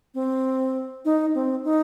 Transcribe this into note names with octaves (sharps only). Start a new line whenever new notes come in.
C4
D#4
C4
D#4